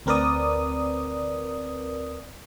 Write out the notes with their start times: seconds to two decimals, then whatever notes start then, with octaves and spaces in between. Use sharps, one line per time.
0.06 D2 C4 A#4 B4 D5 D#6